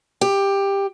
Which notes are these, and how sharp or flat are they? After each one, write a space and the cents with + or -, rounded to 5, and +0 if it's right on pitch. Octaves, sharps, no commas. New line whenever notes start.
G4 +15